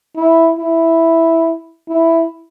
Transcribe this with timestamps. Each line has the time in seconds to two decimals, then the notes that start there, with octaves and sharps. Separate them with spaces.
0.16 E4
0.58 E4
1.88 E4